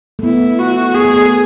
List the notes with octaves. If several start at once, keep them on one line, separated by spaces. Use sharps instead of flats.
A3
B3 E4
F#4
B3 G#4
A3
B3